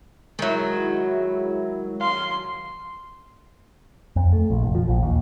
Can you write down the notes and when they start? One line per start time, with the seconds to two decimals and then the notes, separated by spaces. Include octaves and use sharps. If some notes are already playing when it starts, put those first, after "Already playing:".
0.39 D#3 F#3 G#3 E4
2.01 F5 C6
4.16 F2
4.32 A3
4.50 A#1
4.63 F1
4.75 F3
4.88 A#1
5.03 D#2